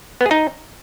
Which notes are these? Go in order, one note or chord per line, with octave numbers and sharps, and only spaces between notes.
B3
G#4
D#4